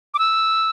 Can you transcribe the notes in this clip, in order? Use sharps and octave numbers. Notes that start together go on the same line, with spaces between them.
D6
E6